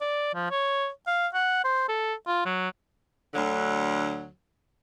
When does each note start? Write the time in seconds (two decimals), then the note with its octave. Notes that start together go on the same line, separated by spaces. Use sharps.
0.01 D5
0.34 F3
0.51 C#5
1.07 F5
1.34 F#5
1.64 C5
1.89 A4
2.27 F4
2.46 F#3
3.34 D2 D3 F#3